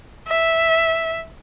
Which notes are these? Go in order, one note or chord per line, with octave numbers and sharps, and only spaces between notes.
E5